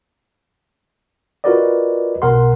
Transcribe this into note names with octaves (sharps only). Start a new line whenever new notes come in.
F4 F#4 A#4 B4 D5 D#5
B1 B2 A#4 F#5 C6